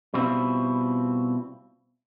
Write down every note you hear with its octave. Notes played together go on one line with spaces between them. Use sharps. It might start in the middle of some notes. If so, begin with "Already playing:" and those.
B2 G3 C4 E4 F4